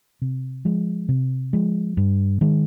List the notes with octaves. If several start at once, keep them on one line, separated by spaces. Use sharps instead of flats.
C3
F3 G#3
C3
F3 G#3
G2
D#3 G#3